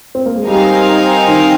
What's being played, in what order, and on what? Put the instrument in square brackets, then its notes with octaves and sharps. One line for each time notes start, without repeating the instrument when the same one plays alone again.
[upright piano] C4
A#3
G#3
[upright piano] G3 [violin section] C4 D#4 A#4 F5 G#5
[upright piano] D#3